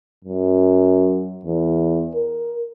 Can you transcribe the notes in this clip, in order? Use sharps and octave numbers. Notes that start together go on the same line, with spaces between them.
F#2
E2
A#4